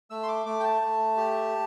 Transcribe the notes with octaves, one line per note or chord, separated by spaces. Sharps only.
A3 E6
C6
D6
A3 D6
G5
A5
A3
G4